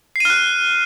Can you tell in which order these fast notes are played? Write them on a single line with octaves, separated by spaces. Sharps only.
C7 D#7 F6 F#6